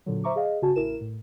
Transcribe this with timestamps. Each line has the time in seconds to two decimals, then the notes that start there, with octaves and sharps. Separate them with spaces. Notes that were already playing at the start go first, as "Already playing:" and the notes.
0.06 A#2 D3 F#3
0.24 C5 E5 A#5 C#6 D6
0.36 G#4 D#5 F5
0.62 G1 C#3 F#4 G#5 A5
0.76 A1 E4 A#4 E7
1.01 A2